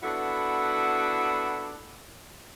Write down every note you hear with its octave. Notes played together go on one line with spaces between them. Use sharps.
B3 D4 E4 F#4 A4